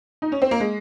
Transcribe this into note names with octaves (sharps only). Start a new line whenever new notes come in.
D#4
C#4
C4
A#3
G#3